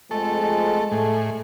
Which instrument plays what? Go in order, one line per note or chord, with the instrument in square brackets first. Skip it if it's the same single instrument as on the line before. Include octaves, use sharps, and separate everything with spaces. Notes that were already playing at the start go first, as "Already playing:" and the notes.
[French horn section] F2 F3 G#3 [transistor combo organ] A3 A4
[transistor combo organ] A2 G#4 [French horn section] G#3 A3